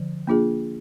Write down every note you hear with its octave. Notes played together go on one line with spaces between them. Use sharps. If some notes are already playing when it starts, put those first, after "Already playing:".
Already playing: D3 F3
A#3 D4 F4 G#4